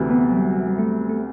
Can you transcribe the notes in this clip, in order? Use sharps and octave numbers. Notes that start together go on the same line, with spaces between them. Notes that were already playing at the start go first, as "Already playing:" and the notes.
Already playing: D2 C3 E3 F#4 G4
B3
F#3
G3
G3
A3
A3